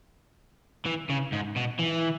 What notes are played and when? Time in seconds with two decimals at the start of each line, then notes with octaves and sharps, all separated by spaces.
0.86 E3
1.09 C#3
1.32 G#2
1.56 B2
1.79 E3